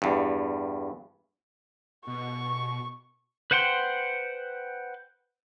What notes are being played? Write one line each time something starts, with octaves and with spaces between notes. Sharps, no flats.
E2 G2
B2 C#6
B4 C5 F#5 G5 C6